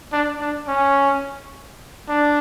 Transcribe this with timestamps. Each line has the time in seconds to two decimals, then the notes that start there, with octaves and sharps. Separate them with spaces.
0.12 D4
0.41 D4
0.68 C#4
2.09 D4